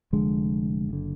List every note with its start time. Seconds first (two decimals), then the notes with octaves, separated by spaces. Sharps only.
0.12 F1 F2 D3 G#3
0.89 F#1 D3